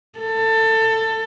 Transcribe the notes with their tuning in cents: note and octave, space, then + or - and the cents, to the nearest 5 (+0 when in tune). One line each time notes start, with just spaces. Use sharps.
A4 +20